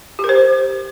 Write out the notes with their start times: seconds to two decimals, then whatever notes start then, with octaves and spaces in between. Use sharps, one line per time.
0.19 G4
0.24 A#4
0.29 C5